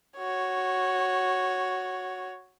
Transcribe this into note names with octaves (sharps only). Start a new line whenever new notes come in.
F#4 C#5